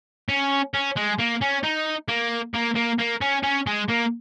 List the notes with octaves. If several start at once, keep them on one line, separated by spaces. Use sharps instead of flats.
C#4
C#4
G#3
A#3
C#4
D#4
A#3
A#3
A#3
A#3
C#4
C#4
G#3
A#3